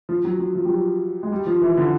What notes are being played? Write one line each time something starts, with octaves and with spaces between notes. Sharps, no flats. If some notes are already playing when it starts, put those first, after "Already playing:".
F3
F#3
F#3
F3
G3
F#3
G#3
G3
F3
E3
D3